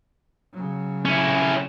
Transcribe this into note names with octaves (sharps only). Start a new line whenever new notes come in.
C#3 F#3
C#4 E4